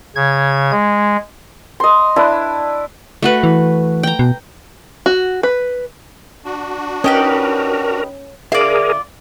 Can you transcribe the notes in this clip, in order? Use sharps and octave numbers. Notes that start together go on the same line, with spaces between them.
C#3 G#6
G#3
D#5 C6
D4 E4 B4
A3 F#4 B4
E3
G5 A#5
B2
F#4
B4
D4 F#4
C#4 D#4 G4 A#4 B4
D3 F4 G#4 A#4 D5 E5